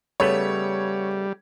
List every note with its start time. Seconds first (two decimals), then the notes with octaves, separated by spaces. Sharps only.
0.20 C#3 G3 A3 B3 C#5